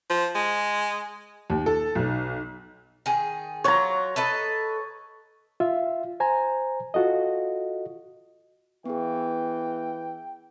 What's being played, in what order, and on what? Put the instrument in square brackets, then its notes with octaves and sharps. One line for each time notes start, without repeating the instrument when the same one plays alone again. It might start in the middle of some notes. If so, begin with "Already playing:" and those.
[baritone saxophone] F3
G#3
[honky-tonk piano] D#2
A4
B1
[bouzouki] D#3 G#4
[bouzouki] F#3 F4 [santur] C#5 A#5
[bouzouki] A4 B4 D#5
[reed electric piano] F4 E5
C5 G#5 A#5
F4 F#4 A4 D#5
[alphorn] E3 [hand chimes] B3 G#4 [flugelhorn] G5